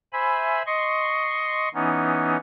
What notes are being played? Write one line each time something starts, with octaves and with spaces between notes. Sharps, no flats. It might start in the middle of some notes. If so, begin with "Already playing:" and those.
C5 E5 G#5 B5
D#5 C6 C#6
E3 B3 C#4 D#4